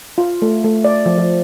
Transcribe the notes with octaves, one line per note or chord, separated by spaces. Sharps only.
F4
A3
A3
D5
F3
F3